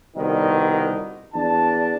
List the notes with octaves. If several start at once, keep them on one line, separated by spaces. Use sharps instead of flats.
C2 B2 D3 D#3
E2 D4 A5